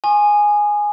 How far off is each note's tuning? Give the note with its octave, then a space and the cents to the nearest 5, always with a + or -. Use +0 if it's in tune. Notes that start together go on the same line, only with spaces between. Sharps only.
G#5 +0 C6 +45 D#6 -40